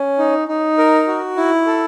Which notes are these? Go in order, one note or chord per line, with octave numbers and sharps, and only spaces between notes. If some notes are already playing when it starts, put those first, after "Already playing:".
Already playing: C#4
D#4
D#4
A#4
F#4
E4
A4